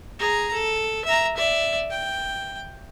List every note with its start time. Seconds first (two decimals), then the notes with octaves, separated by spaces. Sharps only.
0.19 G#4 A#5
0.53 A4
1.05 E5 A#5
1.37 D5 E5
1.91 G5